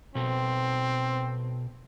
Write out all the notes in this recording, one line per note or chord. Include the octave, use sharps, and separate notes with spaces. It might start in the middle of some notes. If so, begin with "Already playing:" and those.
B2 C4 A4